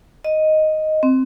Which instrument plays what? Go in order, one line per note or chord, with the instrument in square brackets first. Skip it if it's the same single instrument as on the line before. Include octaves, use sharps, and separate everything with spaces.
[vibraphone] D#5
C4